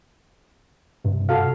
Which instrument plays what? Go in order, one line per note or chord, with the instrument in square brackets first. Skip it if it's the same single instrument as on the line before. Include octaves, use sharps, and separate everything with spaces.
[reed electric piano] G2 C3
[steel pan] F#4 A4 F5